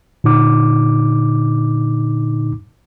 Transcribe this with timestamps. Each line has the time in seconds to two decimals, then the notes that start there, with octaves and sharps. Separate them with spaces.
0.24 A#2 D3 D#4 D6